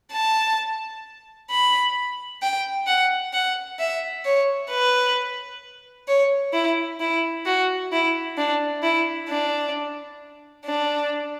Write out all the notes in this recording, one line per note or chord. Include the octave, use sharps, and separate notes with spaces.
A5
B5
G5
F#5
F#5
E5
C#5
B4
C#5
E4
E4
F#4
E4
D4
E4
D4
D4